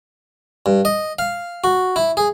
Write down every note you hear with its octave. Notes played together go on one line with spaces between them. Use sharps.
G2
D#5
F5
F#4
E4
G#4